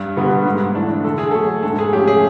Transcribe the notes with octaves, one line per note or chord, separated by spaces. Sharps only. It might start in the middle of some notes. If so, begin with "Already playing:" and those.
Already playing: G2
D3 G3 B3
G#2
E3 A3 D4
D3 A4
G#4
F#3 A3 A4
G#2 A4
G#4
F3 A3 C#4 G4
G#4